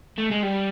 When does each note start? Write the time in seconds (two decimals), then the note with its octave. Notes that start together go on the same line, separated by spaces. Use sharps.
0.18 A3
0.31 G#3
0.43 G3